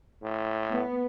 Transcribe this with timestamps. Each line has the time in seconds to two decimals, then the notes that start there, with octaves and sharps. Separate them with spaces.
0.23 A2
0.72 B3